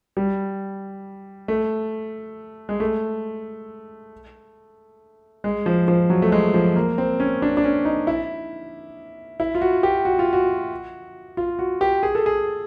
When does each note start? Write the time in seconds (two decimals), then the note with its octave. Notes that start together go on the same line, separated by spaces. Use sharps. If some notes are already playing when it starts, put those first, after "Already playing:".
0.17 G3
1.48 A3
2.69 G#3
2.80 A3
5.44 G#3
5.66 F3
5.88 F3
6.10 F#3
6.22 A3
6.32 G#3
6.54 F3
6.76 A#3
6.98 C4
7.20 C#4
7.42 D4
7.57 D4
7.64 C#4
7.85 D#4
8.07 E4
9.40 E4
9.55 F4
9.62 F#4
9.83 G4
10.05 F#4
10.19 F4
10.33 F#4
11.37 F4
11.59 F#4
11.81 G4
12.03 G#4
12.15 A4
12.26 G#4